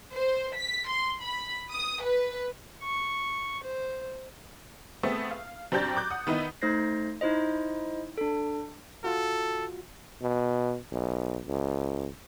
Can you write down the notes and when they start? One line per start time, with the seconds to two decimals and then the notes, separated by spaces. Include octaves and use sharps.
0.13 C5
0.56 B6
0.88 C6
1.21 B5
1.72 D#6
2.04 B4
2.82 C#6
3.64 C5
5.03 A3 B3 C4 G#4 E5
5.31 F5
5.72 F#2 C4 D4 G4 G6 A6
5.97 D6 F#6 G6
6.11 F#5 D#6
6.27 D#3 B3 E4 D#5
6.61 A3 D#4 C5 G6 A#6 C7
7.21 D#4 E4 C5 D#5
8.18 D4 A4
9.04 F4 F#4 A4
10.22 B2
10.92 B1
11.47 C#2